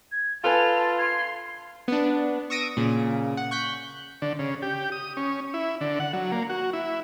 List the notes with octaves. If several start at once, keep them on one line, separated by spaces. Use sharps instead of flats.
G#6
F4 A4 B4 G#5 A5 F7
C6 G#6
B3 D4
C#6 D#6 E6 A#6 D7 D#7
A#2 C#3
F#5
C#6 F#6 G6 B6
D3
C#3
G4
D#6
C#4
E4
D3
F#5
F#3
A#3
F#4
E4